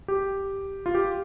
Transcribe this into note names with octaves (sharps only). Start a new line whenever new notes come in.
G4
F4
G4